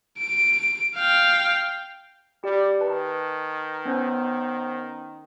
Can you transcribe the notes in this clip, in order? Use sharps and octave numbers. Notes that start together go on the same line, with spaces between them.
D7
F5 G5
G3 G4 D5
D#3 B4 A5
B3 C#4 C5